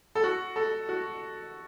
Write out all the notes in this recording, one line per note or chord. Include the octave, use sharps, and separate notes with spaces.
A4
F#4
A4
F#4